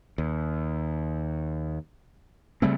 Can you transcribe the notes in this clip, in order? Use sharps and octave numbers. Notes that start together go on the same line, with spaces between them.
D#2
C#3 G3 A3 C4